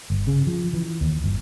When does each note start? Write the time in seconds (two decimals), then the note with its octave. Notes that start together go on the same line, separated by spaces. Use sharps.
0.10 G1
0.27 C#3
0.47 F3
0.73 E3
1.01 D#2
1.24 G1